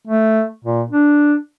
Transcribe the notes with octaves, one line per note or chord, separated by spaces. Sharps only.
A3
A#2
D4